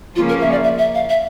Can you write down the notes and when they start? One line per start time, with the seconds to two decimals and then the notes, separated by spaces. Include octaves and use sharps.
0.16 C#3 F3 A#3 C#4 F4
0.29 A#4
0.41 E5
0.51 D5
0.64 E5
0.78 E5
0.95 F5
1.10 E5